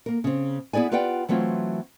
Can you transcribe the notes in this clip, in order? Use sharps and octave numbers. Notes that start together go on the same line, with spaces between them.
A#3 A#4
C#3 C4
B3 E4 G#4 D5 G#5
F4 G4 B4 D5 F#5 G5
E3 F#3 A3 C4 F4